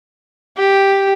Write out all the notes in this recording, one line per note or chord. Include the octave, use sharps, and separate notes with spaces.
G4